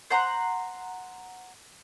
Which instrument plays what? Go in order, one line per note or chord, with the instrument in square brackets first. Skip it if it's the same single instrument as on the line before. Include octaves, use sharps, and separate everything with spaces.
[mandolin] C5 F#5 A#5 C6